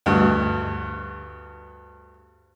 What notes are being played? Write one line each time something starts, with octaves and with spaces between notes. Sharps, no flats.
D2 G2